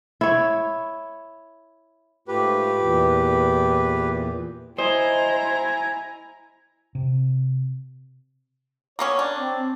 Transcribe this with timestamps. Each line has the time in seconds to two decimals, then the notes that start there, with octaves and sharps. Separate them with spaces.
0.21 E4 C#5
2.28 G#2 A3 F4 G4 B4
2.82 E2 A#2 E3
4.78 E4 C5 D#5 G#5 A#5
6.95 C3
8.99 A#3 B3 C#4 C#5
9.19 D4
9.36 C4